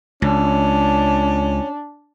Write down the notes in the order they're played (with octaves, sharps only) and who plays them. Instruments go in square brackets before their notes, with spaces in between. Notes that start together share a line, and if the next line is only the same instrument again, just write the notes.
[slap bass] C#2 [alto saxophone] C#4 [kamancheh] D4